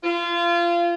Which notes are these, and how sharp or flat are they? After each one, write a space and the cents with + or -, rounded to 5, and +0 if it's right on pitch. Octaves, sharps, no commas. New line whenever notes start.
F4 -25